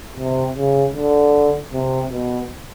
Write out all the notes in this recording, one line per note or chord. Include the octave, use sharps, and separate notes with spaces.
C3
C#3
D3
C3
B2